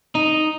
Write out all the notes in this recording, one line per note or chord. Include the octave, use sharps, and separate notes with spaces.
D#4